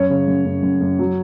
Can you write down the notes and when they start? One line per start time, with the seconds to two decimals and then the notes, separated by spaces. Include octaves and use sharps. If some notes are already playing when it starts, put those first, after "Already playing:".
Already playing: F#2 C#5
0.10 C#3
0.27 F#2
0.45 F#2
0.63 F#2
0.81 F#2
0.99 F#3